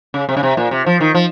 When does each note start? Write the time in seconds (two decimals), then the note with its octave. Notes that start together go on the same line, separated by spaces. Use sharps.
0.14 C#3
0.29 C3
0.37 C#3
0.43 C3
0.57 A#2
0.71 C3
0.86 F3
1.01 D#3
1.15 F3